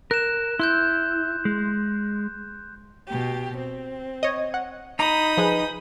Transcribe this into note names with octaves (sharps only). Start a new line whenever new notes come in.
A#4 F#6 E7
E4 C6 F#6 G6
G#3
B2 G4
C4
C#5 D#5
F#5
D#4 A#5 B5 D#6 G6
F3 G#4 B4